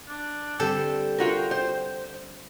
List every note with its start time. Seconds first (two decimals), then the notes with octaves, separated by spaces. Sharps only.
0.09 D4
0.60 D3 G3 C4 A4 G5
1.18 F4 F#4 A#4
1.51 C5